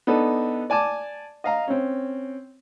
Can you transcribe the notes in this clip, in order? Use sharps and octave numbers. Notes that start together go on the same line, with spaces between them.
B3 D4 D#4 A4
D5 G#5 A5 D6
D#5 F5 A#5
C4 C#4